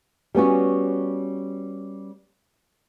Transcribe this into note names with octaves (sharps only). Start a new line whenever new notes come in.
G3 B3 C#4 F#4